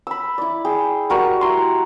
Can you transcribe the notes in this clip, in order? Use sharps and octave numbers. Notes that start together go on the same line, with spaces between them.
B5 E6
E4 D5
G#4 G5
G3 F#4 A#4 C#6
E4 A#5 C6